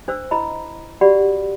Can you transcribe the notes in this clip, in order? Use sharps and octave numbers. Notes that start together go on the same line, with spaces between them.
D4 C5 E6
E4 D#5 A#5 B5
F#4 G4 D5 F#5 B5